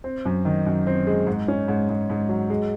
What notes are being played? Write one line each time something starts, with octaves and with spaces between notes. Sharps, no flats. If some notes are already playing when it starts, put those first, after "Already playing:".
C4
F#2
D#3
F#2
C4
G#3
G#2
C#4
G#2
G#2
G#2
F#3
G#3